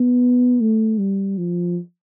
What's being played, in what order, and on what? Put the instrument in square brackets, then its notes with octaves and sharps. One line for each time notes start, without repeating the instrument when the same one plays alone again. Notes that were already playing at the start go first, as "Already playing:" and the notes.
Already playing: [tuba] B3
A3
G3
F3